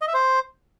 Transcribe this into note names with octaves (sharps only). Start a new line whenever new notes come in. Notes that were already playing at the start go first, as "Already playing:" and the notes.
D#5
E5
C5